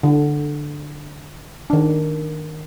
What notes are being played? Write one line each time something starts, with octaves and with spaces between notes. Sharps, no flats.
D3
D#3 D4